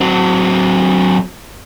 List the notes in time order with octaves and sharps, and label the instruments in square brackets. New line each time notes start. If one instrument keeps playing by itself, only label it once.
[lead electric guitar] F#3 C4